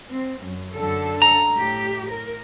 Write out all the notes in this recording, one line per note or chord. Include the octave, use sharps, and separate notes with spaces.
C4
F#2
F#2 D3 A4
A#5
A2 G4
A#4